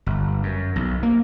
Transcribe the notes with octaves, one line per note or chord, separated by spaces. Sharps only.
G1
F#2
B1
A#3